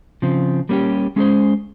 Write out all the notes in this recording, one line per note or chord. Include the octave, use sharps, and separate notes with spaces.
C#3 F3 C4
G3 A#3 C#4 G4
G#3 C#4 G#4 C5